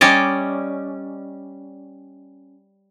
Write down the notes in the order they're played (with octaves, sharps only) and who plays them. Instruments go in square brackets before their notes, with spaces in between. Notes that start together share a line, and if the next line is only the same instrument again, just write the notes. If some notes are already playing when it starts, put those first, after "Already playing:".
[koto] G3 C#4 D5 D#5